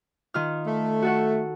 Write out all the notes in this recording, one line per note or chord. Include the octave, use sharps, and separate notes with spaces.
D#3 F4 F6
A3
F#4 A4 F#5